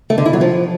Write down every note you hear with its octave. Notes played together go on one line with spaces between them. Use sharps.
A3
D3
E4
F#3
F3